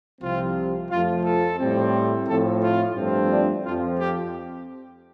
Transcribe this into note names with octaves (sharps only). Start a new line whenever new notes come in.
C2 C3 F3 C4 F4
F2 F3 A3 F4
A4
A2 G3 C4
A2 F3 C4 A4
F4
G2 F3 A3 C4
D4
F2 F3 C4 F4
G4